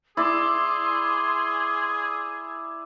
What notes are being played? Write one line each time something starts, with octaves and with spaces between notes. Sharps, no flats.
E4 G#4 D5 C6 D6 E6